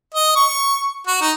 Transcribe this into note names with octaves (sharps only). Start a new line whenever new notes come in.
D#5
C#6
F#4
D#4